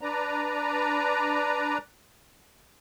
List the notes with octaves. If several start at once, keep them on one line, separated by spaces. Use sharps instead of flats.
D4 B4 D5 A#5